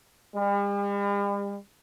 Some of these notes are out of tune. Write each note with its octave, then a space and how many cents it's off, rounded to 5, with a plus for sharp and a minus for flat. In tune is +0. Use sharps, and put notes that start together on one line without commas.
G3 +45